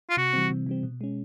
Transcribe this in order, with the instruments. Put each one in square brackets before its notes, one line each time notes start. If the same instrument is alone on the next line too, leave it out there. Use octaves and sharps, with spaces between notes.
[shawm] F4
[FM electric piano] C3 [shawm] F#4
[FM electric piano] E3 G3 C4
C3
E3 G3 C4
B2
G#3 C#4